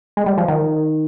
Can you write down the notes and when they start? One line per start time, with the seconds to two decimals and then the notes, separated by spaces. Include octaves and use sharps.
0.17 G#3
0.26 G3
0.38 F3
0.48 D#3